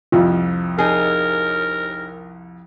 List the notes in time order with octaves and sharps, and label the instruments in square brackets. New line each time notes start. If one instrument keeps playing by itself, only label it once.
[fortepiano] C2 F2 [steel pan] F4
[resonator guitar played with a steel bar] D#4 G#4 [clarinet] A#4